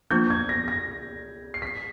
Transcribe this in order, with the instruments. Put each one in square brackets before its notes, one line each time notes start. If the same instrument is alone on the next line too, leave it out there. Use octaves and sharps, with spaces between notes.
[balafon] F3 A#3 D4 F4 [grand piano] G6
[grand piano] G#6
A#6
A#6
C7
B6